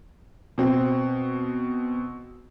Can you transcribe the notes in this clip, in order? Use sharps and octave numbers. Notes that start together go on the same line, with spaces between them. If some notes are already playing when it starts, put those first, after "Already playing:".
B2 C4